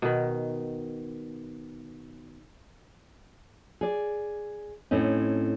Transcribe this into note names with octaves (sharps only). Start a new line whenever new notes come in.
B2 D#3
G#4 D5
A2 C4 C#4 D#4